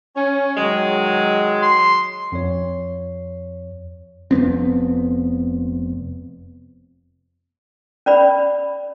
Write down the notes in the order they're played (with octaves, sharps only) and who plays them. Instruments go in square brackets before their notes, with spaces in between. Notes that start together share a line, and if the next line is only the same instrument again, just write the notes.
[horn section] C#4
D#3 F#3 G#3
[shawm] C6
[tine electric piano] F2 C#5
[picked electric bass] F1 F2 B3 C4
[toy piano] C#4 D5 B5